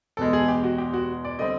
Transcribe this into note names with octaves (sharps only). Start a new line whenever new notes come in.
E2 B2 G#3 A4
G#4
G4
F#4
G4
F#4
D5
D3 G3 C4 D#5